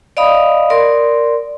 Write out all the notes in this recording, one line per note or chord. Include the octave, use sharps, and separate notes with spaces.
D5 D#5 F5 B5 D#6
A#4 D5 C6